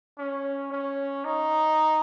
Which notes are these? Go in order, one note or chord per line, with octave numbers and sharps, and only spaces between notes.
C#4
C#4
D#4